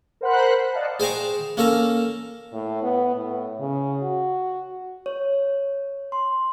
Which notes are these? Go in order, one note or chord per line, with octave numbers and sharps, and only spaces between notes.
A#4 C5 F#5 B5 F#6
D5 D#5 F5 F#5 A5
G#4 C5 G5 A5 A#5 C#6
A#3 C#4 A4 A5 A#5
A2
B3
A2
C#3
F#4
C#5
C6